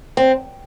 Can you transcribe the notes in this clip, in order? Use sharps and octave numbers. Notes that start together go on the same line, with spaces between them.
C4